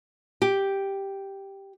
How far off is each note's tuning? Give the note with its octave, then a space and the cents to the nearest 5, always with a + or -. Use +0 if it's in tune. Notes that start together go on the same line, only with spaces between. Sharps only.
G4 +0